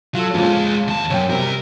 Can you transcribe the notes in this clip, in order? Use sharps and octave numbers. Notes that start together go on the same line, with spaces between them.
F#3 F4 A4
F2 A#2 G#3 F4
D#2 A5
C2 F#2 C#5 G5
C2 C3 G3 A#4